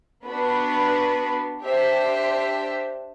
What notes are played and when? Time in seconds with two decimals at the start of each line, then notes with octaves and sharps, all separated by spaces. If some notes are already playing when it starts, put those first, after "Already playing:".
0.24 B3 D4 F#4 B4
1.61 D4 G4 C5 E5